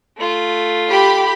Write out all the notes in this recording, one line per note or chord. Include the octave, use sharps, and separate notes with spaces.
A3 F4
G4 B5